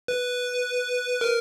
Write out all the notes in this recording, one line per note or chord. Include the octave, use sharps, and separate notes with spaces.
B4
A#4